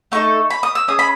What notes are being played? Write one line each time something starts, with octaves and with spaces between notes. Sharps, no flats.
A3 D#4 A4 C#6
B5
D#6
E6
C#4 G#4 D#6
B5